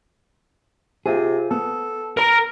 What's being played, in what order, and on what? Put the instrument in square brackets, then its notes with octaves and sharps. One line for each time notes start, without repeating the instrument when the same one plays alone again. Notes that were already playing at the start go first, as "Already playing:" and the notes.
[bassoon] C3 [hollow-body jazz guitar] F4 G#4
[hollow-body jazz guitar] B3 [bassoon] A4
[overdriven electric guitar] A#4 A#5